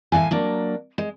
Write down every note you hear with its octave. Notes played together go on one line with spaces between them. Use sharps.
A2 E3 F5 G#5
F#3 A#3 D4
G#3